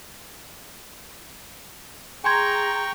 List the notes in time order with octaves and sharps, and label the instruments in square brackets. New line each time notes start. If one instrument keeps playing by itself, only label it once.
[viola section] G#4 A#5 [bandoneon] G5 C#6 [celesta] G#5 C6 G#6